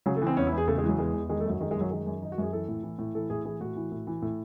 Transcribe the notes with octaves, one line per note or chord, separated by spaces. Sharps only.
C#3 F#3
A3
E3
C4
E2 C#4
E4
E2 G#4
C#3 A3
G#3
E3 F#3
E2 G#3
E2
D#3 G#3
A3
F#2 F#3
D#3 G#3
G#3
F#2
F#3
D#3 G#3
F#2
D#3 D#4
F#4
F#2 G#4
E3 A4
A2
E3
A2
E3 A4
A2 G#4
E3 G#4
A2 F#4
E3
A2
E3
A2